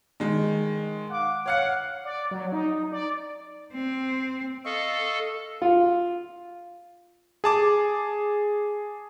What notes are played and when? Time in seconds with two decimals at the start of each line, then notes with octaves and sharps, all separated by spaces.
0.20 D#3 G#3
1.10 F5 F#5 D6
1.46 C#5 F5 F#5 C#7
2.04 D5
2.31 F#3
2.52 D#4
2.92 D5
3.74 C4
4.65 A4 D#5 F5 C#6
5.62 F4
7.44 G#4 A5 D6